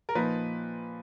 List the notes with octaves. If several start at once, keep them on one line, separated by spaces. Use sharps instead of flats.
A#4
A#2 F3 A#3 D#4 B4